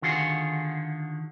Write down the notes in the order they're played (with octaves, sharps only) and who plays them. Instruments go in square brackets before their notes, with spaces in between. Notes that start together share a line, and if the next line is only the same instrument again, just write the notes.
[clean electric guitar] D3 D#3 F4 F#4 G#4